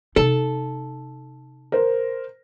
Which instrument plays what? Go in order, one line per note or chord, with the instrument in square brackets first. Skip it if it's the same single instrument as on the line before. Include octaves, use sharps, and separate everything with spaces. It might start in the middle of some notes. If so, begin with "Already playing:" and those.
[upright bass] C3 D#4 [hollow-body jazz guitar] A4
[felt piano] A#4 C5